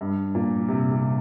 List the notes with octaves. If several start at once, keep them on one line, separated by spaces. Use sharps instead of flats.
G2
A#2
C3
C3